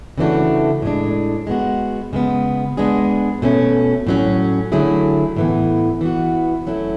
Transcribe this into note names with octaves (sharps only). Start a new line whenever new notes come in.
C#3 E3 A3 D4 F#4
A2 G#3 D4
G#3 B3 F#4
C#3 G#3 B3
G#3 B3 D4 G#4
B2 A3 C#4
A2 F#3 C#4
D3 F#3 A3 E4 G#4
A2 E3 B3
E3 B3 F#4
F#3 A3 C#4 E4